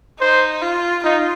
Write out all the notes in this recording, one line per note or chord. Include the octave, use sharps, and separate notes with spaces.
D#4 C5
F4
D#4 F4